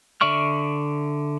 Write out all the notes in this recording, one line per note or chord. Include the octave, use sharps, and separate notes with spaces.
D3 D5 E5 C#6 F6